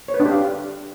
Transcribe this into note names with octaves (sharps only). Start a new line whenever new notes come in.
C#5
B4
D4
G4
F5